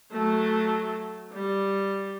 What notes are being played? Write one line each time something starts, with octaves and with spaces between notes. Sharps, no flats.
F#3 A3
G3